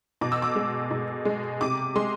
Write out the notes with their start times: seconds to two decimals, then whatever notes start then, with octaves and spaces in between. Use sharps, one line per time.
0.21 B2 D6
0.32 E6
0.42 D6
0.55 G#3
0.91 B2
1.25 G#3
1.61 C3 D6
1.95 G#3 C6